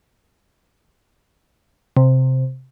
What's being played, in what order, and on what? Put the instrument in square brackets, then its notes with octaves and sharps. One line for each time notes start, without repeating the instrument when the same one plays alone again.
[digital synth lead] C3